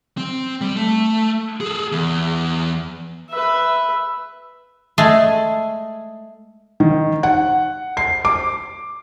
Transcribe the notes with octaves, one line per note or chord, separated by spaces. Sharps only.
C4
G3
A3
G#4 A4
E2
B4 E5
G#3 A3 G#4
D#3
F#5
C7
D6